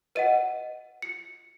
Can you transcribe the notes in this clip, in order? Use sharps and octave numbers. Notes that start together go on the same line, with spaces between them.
B4 D#5 F#5 D#7
C#7